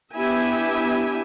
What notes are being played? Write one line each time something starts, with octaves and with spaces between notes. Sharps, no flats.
B3 D4 E4 G4 E5 G#5